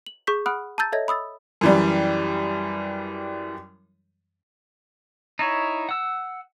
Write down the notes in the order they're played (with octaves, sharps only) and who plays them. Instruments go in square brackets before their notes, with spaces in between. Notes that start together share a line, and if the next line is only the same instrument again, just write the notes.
[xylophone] F#7
G#4 C#6 G6 B6
F#5 B5 D#6 F6 F#6 D7
A5 A#5 E6 G6 A6
A4 C#5 D#5 E5 G#6 A#6
B5 D#6 E6 A6
[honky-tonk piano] F#2 E3 G3
[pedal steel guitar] D#4 E4 C#5
F#5 E6